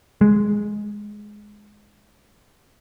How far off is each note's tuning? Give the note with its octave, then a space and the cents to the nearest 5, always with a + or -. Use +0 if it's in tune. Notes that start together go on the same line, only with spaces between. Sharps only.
G#3 +5